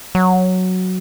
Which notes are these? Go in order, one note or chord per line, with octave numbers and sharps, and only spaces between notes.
F#3